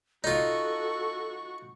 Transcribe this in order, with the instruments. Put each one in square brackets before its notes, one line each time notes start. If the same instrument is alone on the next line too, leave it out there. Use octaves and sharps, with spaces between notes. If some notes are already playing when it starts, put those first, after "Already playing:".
[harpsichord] D#4 F4 [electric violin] F#4 C#6 [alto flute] A4